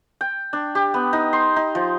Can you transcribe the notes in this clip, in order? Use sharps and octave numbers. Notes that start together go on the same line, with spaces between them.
G5
D4
G4
B3
D#4
C6
D#4
F3